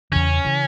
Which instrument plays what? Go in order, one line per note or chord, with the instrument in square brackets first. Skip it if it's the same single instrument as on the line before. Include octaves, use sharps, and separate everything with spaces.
[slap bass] E2 C#3 E3 [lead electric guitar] C#4
[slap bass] C#3 E3